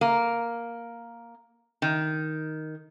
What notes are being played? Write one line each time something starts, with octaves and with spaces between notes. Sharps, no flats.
A#3
D#3